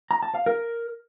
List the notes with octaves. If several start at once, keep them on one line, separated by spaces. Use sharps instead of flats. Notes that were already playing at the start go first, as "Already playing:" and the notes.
A#5
A5
F5
A#4